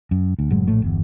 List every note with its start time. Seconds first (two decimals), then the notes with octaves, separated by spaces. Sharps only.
0.11 F#2
0.39 D2
0.50 F#1 A2 F#3 G#3
0.67 A#1 A2 A3
0.82 G1 E2